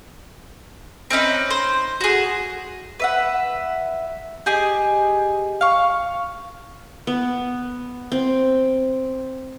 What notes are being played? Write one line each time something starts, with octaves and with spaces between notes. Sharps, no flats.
C4 C#4 D#4 B4
C5
F#4 G#4
B4 E5 F#5
G4 G#4 D#5 G#5
F5 C#6
B3
C4